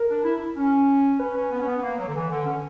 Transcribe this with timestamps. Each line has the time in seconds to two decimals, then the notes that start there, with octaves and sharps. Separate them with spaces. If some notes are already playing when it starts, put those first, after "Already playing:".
Already playing: A#4
0.10 D4
0.24 E4
0.56 C#4
1.19 C#4 B4
1.36 C#4
1.52 B3
1.60 C#4
1.67 B3
1.82 A#3
1.98 F#3
2.08 D3
2.15 E3
2.31 D3
2.46 C#4